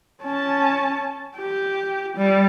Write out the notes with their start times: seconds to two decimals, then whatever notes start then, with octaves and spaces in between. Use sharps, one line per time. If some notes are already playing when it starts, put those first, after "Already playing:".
0.23 C#4 A5
1.37 G4
2.17 G3